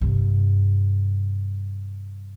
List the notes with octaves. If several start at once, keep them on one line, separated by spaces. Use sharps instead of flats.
G2 C3